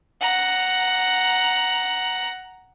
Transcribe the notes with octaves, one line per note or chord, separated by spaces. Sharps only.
F#5 A#5